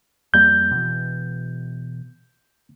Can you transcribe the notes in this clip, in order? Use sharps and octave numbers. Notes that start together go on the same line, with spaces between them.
F2 G3 A#3 G6
B2 E3